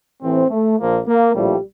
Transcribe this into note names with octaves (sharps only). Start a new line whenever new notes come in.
A1 A2 E3 C4
A3
A#1 A#2 F3 A#3
A#3
A#1 A2 F3 G3